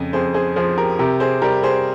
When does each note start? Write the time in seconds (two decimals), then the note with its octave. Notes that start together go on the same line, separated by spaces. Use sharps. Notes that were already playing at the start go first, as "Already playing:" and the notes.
Already playing: F2 C#3
0.13 F2 G#4 C5
0.34 G#4 C5
0.56 F3 G#4 C5
0.77 G4 A#4
0.99 C3 G4 A#4
1.20 G#4 C5
1.42 G3 G4 A#4
1.63 G#4 C5